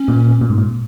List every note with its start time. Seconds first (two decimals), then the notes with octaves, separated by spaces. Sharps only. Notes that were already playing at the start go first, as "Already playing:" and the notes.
Already playing: C#4
0.08 A#2
0.41 A#2
0.50 G#2
0.58 A#2